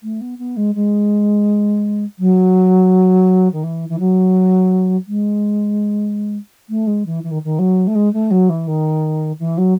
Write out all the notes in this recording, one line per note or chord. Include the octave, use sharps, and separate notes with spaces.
A3
B3
B3
G#3
G#3
F#3
D#3
E3
E3
F#3
G#3
A3
G#3
E3
E3
D#3
D#3
F#3
A3
G#3
A3
F#3
E3
D#3
E3
F#3